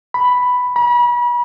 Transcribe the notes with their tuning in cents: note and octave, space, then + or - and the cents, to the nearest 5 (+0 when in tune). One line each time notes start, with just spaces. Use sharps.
B5 +5
B5 -35